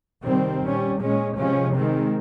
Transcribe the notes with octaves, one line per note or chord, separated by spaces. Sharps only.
C3 D#3 G3 C4
A#2 G3 C#4
A#2 G#3 C#4
C3 F3 G#3 C#4
D#3 G#3 C4